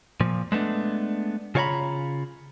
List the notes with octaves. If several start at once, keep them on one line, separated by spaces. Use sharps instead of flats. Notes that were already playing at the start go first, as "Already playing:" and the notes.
A#2 F3
G#3 A3 B3 D4
C#3 F4 C#5 E5 A#5 B5